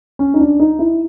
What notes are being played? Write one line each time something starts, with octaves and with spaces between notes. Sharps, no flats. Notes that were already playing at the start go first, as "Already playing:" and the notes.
C#4
D#4
D4
D#4
E4